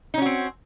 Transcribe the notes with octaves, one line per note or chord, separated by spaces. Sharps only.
C4 C#4 D#4 F#4